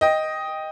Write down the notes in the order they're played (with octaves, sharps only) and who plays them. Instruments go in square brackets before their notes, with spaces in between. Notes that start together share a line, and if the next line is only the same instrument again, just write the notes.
[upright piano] D#5 G5